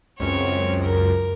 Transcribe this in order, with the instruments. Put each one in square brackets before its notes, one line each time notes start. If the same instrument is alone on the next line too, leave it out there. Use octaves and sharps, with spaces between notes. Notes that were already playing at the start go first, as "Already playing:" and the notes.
[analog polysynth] C#2 F#2 [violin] C4 C#5
[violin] A#4